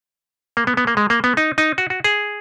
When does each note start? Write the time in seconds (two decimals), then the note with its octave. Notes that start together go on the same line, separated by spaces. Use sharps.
0.57 A#3
0.67 B3
0.77 B3
0.87 A#3
0.97 G#3
1.10 A#3
1.24 B3
1.37 D#4
1.58 D#4
1.78 F#4
1.90 F#4
2.04 G#4